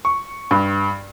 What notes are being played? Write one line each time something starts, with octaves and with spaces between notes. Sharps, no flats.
C#6
G2